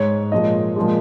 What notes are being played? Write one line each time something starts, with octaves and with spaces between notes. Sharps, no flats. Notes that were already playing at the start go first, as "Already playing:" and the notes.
Already playing: G#2 G#3 C#5
A#2 F3 G#3 D#5
A#2 F3 G#3